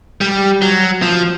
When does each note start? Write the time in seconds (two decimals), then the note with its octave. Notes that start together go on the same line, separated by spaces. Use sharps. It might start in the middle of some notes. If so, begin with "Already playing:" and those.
0.21 G3
0.62 F#3
1.02 F3